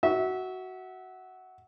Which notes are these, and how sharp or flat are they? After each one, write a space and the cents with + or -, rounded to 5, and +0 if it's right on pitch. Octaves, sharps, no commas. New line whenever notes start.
F#4 +10 E5 -20